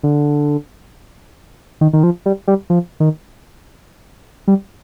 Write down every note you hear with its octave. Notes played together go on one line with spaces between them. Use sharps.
D3
D#3
D#3
F3
G3
G3
F3
D#3
G3